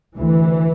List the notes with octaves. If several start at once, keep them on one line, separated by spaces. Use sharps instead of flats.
D2 E3